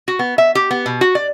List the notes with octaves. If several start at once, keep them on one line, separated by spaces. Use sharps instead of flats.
F#4
B3
E5
G4
B3
B2
F#4
D5